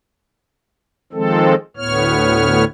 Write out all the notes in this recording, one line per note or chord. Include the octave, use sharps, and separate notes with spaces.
D#3 F3 G#3 C4 A4
D2 A2 B3 C#5 F6